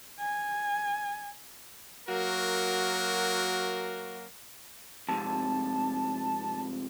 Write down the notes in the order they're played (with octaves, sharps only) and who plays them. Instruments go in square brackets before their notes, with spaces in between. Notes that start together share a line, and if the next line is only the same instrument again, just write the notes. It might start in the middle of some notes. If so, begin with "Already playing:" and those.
[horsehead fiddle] G#5
[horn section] F#3 A#3 F#4 A#4
[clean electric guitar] F2 G#2 C3 [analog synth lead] A5